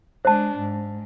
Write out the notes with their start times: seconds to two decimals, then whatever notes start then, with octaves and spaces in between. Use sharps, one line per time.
0.25 G#3 D4 C5 A5
0.59 G#2